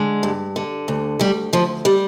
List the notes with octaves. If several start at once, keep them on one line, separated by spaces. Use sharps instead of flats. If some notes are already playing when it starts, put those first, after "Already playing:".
Already playing: D3 G#3
G2
D3
D2
D2 G3
D2 F3
G3